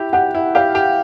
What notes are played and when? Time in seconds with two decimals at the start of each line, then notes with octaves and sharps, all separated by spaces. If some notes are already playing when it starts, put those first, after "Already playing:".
Already playing: E4 G4
0.13 G4 F#5
0.35 E4
0.55 G4 F5
0.75 G4